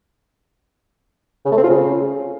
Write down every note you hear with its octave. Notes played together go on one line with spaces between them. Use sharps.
C#3
A3
C4
F4
C#3